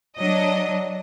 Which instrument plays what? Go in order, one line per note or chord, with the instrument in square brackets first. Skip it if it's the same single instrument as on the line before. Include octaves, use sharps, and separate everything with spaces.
[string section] F#3 D4 D#5